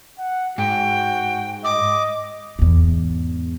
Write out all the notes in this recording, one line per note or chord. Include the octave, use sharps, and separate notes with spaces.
F#5
G#2 F#4 G5
D#5 D6
E2 G#2